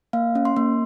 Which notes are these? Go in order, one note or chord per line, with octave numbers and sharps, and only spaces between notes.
A#3 F5
C#4
C6
A#3